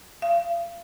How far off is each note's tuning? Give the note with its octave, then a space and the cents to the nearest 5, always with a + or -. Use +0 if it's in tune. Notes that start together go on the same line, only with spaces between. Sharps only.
F5 -40